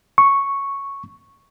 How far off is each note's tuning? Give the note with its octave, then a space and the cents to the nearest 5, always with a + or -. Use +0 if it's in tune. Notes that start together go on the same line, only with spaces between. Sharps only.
C#6 +0